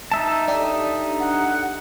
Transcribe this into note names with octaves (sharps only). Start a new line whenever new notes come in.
D#4 E5 A5
D4 G4 A4
F#5